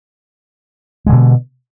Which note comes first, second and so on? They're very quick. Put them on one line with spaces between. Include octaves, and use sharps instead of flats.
G#3 D3 B2